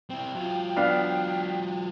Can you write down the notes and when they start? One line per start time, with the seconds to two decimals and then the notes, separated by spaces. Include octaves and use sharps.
0.10 C4 E4 G5
0.35 F#3 F4
0.76 B3 D4 F5